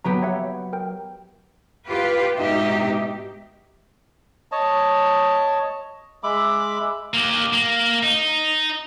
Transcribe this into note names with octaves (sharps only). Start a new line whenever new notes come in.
F#3 B3 G4 A#5
C#5 E5 F#5
A#4 G5
F4 G4 B4
G#2 B2 D#4 G4 E5
C#5 D#5 A5
G#3 E5 B5 D6
A#3 G4
A#3
D#4